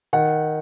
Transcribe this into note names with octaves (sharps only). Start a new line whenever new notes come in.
D#3 F#5